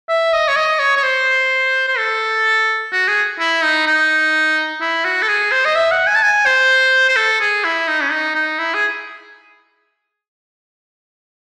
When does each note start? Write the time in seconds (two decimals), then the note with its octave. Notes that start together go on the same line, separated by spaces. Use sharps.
0.09 E5
0.33 D#5
0.48 C#5
0.56 D#5
0.79 C#5
0.96 C#5
1.03 C5
1.88 C5
1.98 A4
2.92 F#4
3.08 G#4
3.39 E4
3.63 D#4
3.87 D#4
4.81 E4
5.04 F#4
5.22 A4
5.28 G#4
5.52 C5
5.65 D#5
5.75 E5
5.91 F#5
6.07 G#5
6.15 A5
6.23 G#5
6.46 C5
7.09 C5
7.17 A4
7.41 G#4
7.64 E4
7.88 D#4
8.02 C#4
8.11 D#4
8.35 D#4
8.59 E4
8.74 G#4